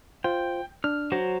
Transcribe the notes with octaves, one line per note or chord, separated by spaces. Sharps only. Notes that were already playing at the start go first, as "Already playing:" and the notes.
F4 C5 G5
D4 F6
F#3 F#4 C5